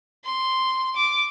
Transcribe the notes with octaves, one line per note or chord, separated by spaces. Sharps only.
C6
D6